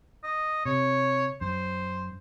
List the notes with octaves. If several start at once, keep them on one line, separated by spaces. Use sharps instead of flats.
D#5
C3 C#5
F#2 C5